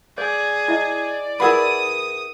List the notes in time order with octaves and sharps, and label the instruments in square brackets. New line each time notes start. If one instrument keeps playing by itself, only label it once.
[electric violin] G#4 [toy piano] C#5 [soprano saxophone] D5
[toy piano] E4 D#5
[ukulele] E4 G#4 B4 [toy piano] A#4 F#5 B5 [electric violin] D#6